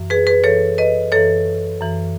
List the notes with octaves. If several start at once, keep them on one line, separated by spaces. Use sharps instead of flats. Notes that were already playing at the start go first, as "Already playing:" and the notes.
Already playing: F#2 E3
G#4 B4
G#4 B4
F#2 E3 A4 C#5
B4 D#5
F#2 E3 A4 C#5
F#2 E3